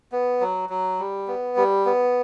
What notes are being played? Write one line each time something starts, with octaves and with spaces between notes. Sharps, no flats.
B3
F#3
F#3
G3
B3
G3
B3